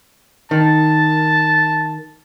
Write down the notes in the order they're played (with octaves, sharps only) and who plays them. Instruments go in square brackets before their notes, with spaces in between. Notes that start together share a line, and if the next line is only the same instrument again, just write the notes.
[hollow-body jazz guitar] D#3 [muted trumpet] A5